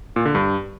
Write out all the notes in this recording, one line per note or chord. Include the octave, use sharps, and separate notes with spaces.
A#2
D3
G2